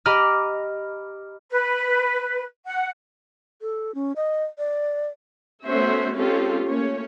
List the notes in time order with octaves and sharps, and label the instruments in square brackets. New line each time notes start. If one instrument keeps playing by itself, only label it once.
[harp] G4 D#5 A#5 B5 D6 F6
[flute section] B4
F#5
[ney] A4
C#4
D#5
D5
[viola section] A3 B3 C#4 F#4 C5 E5
G#3 C4 C#4 F4 G4 A4
A3 A#3 C#4 C#5